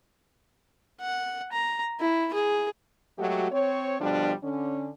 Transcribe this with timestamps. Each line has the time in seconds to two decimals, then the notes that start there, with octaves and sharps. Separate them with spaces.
1.01 F#5
1.53 A#5
2.00 E4
2.34 G#4
3.18 F#3 G#3 A3 F#4 G4
3.52 C4 C5 C#5
4.00 B2 D3 F3 G3 D4
4.42 D3 C#4